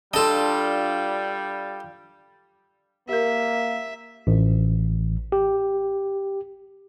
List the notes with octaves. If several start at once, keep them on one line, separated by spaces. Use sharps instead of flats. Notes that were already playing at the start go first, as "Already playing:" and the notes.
G3 D4 F4 A4 D#5
A#3 G4 A#4 E5
A1
G4